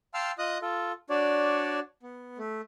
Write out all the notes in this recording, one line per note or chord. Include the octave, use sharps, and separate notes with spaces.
F5 G5 A5 C6 E6 F6
F4 D#5 D#6 F#6
F4 A4
D4 F#4 C#5 D5
B3
A3